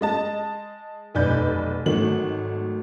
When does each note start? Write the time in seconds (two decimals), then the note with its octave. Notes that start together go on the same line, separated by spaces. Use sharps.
0.01 G#3 D#5 A5
1.15 F1 B1 B4 D5 G6
1.86 G#1 D#3 F#3 A3 F#7